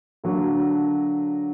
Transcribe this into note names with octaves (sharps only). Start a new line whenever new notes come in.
D3 F#3 A#3 D4 F#4